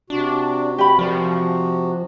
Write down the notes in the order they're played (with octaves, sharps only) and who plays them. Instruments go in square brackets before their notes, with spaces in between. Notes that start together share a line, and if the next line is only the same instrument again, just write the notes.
[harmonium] C3 F#4 [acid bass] D4
[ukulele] G4 B5
[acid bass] F3 [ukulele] A#4 D5